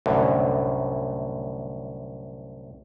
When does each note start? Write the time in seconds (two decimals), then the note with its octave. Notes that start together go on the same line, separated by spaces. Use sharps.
0.06 C2 F#2 A2 D3